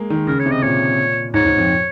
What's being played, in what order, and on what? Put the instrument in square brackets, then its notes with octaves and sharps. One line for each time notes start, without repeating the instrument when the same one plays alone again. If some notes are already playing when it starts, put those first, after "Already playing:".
Already playing: [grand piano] G#3 A#3
D#3
[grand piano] C#3 [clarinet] A#4
[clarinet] C#5
[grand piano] C3
[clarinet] D#5
[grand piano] A#2 [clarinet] C#5
[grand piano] G#2 [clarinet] C#5
[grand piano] G#2
F2